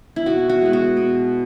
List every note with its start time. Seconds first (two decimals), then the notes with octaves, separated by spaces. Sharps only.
0.16 E4
0.26 B2 F#4
0.49 F#4
0.61 G#3 B3
0.73 F#4
0.97 B2